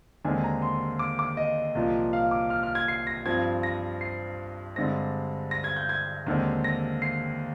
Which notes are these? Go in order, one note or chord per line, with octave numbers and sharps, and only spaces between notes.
D#2 D3 G#3 C4 G#5
A#5
C6
D6
D6
D#5
C2 A#2 F3
F5
D6
F6
F6
G#6
C7
A#6
G2 F3 C4 G#6
A#6
C7
G2 D3 G#3 C4 A#6
A#6
G#6
G6
G#6
D#2 D3 G#3 C4
A#6
C7